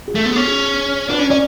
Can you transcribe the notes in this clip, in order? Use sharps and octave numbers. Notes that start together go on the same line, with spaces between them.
G#4
A3 A4
B3
C#4 G#4
G#4
D4 B4
C#4 C#5
C#4 D5